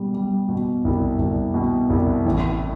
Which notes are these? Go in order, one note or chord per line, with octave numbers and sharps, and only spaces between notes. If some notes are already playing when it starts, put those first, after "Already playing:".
Already playing: B2 G3
G3
B2
C2
C2
B2
C2
A1